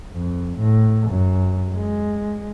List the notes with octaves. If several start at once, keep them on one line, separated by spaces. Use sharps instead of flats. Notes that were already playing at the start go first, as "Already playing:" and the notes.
F2
A2
F#2
G#3